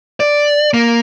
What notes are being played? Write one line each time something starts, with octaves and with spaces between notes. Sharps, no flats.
D5
A#3